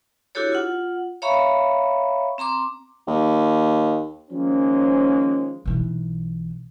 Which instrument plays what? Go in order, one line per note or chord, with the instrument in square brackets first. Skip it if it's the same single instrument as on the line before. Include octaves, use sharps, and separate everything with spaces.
[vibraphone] D4 E4 F#4 G4 A4 C#5
F4 F#5
C#5 E5 F5 A#5 B5 C#6
C4 A#5 C6 D6
[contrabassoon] D#2
[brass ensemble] D#3 F3 G#3 A#3 C4 C#4
[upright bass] B1 E3